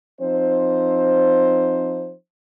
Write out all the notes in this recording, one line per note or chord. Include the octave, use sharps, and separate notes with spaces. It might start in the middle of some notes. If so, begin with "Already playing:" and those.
F3 C4 D#4 C5